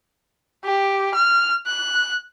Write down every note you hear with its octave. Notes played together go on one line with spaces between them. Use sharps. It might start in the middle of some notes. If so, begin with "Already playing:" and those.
G4
F6
F#6